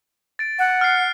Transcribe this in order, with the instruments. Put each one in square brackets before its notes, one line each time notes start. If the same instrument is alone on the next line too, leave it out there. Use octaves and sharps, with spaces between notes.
[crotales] A6 D7
[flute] F#5
[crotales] F6 C7